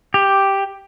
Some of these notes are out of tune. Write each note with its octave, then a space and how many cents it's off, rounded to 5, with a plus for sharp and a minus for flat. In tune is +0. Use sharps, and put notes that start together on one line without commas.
G4 +0